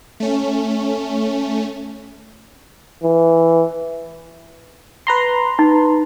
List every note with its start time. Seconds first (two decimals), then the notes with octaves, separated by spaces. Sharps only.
0.20 A3 C#4
3.03 E3
5.07 B4 A#5 C6
5.59 D#4